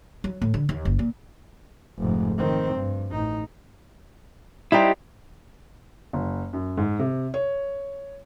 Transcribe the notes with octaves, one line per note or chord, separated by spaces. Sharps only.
F#3
A2
D3
D#2
F#1
A#2
F1 G#2
D#3 C4
G2
A1 D#4
G3 D#4 E4 G4 C5
F#1
F#2
G#2
C3
C#5